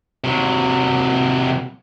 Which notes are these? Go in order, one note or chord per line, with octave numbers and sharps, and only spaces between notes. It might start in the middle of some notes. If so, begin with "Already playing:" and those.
C3 F#3